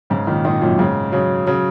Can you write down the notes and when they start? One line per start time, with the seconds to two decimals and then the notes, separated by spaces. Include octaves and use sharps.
0.10 G#2 C#3
0.27 A#2 D#3
0.45 A#2 D#3
0.62 F#2 A#2
0.79 G#2 C#3
1.12 C#3 F#3
1.47 C#3 F#3